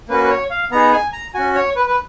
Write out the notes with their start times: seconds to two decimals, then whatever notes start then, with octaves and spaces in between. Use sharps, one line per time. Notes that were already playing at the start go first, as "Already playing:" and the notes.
0.09 A#3 C#4 F#4 B4
0.24 B4
0.29 C#5
0.50 F5
0.71 B3 D#4 G#4 A#5
0.93 G#5
1.13 A#5
1.34 C#4 F#4 G#5
1.55 C#5
1.76 B4
1.87 B4